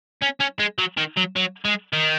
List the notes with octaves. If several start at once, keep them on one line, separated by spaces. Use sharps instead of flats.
C#4
C#4
G#3
F#3
D#3
F#3
F#3
G#3
D#3